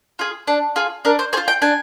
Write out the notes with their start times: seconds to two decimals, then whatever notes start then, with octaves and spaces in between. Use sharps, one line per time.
0.19 F4 G#4
0.48 D4
0.76 F4 G#4
1.05 D4 A#4
1.19 C5
1.33 G#4 C5
1.37 F4
1.48 G5
1.62 D4 G#5